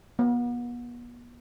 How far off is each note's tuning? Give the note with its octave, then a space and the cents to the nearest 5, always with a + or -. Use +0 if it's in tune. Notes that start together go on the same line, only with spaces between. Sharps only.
B3 -40